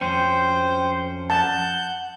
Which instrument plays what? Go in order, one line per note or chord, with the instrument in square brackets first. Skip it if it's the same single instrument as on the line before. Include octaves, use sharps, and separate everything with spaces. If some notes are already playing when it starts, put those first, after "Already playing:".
[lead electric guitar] F2 C#4 [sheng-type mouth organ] C5 [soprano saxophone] G5
[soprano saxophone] F#5 [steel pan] A5 [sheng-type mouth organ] G6